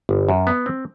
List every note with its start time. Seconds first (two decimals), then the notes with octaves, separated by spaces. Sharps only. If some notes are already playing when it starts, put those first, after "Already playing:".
0.09 G1
0.28 F#2
0.47 B3
0.66 C4